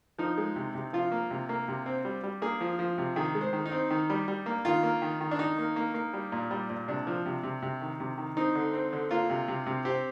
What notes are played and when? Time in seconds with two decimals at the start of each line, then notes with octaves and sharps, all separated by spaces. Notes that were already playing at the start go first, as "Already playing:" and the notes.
0.18 F3 D#4
0.37 G#3
0.56 C3
0.75 C3
0.93 F3 F4
1.12 A#3
1.31 C3
1.49 A#3
1.68 C3
1.86 C4
2.05 G3
2.23 G3
2.42 A#3 G#4
2.61 F3
2.79 F3
2.98 C3
3.16 D#3 G#4
3.35 G#3
3.41 C5
3.53 D#3
3.66 D#4
3.72 C4
3.90 D#3
4.10 G3
4.28 G3
4.46 A#3
4.65 D#3 F4
4.83 A#3
5.02 D#3
5.21 D#3
5.31 D4
5.39 D#3 D#4
5.58 A#3
5.76 A#3
5.94 A#3
6.13 G3
6.32 A#2
6.51 G3
6.70 A#2
6.88 C3 D4
7.07 F3
7.26 C3
7.43 C3
7.62 C3
7.81 D#3
8.00 C3
8.18 D#3
8.37 C4 D#4
8.55 D3
8.74 C4
8.93 D3
9.11 A#3 F4
9.30 C3
9.48 C3
9.67 C3
9.85 C4 G4